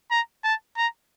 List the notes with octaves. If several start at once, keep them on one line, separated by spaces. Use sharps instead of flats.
A#5
A5
A#5